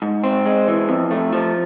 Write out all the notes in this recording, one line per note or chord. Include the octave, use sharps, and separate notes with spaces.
G#2
C4
G#3
E3
F2
A3
F3